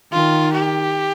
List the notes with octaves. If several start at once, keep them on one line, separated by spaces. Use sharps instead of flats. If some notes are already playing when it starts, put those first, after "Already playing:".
D#3 F4
G4